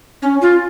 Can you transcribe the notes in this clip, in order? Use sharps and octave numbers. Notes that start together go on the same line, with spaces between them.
C#4
F4